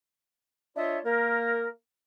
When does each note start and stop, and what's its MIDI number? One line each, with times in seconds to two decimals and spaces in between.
0.76 0.99 62
0.76 0.99 65
0.76 0.99 73
0.76 0.99 75
0.76 0.99 76
1.05 1.67 58
1.05 1.67 70